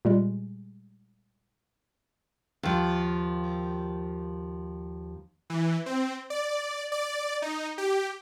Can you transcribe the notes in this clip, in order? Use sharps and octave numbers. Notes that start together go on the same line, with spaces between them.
A#2 G3 G#3
D#2 F3
E3
C4
D5
D5
D#4
G4